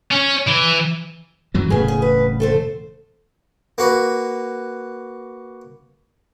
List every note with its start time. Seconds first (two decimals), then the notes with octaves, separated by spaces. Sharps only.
0.11 C#4 C#5
0.48 E3
1.54 F#2 E3 F#3
1.70 E1 A2 C#3 G#4 B4
1.88 G#4
2.02 B4
2.40 A3 A4 C5
3.78 A#3 F#4 B4